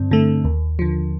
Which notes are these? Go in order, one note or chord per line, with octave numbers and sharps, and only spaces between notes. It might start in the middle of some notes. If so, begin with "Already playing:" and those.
Already playing: G2 D3 C4
D3 A3
D#2
D3 F3